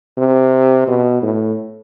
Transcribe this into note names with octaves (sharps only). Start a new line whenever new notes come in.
C3
B2
A2